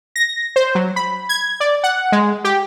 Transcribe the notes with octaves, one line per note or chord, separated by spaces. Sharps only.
A#6
C5
F#3
B5
G#6
D5
F#5
G#3
G4